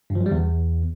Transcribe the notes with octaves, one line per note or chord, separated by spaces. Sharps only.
G2
F3
F#3
G3
E2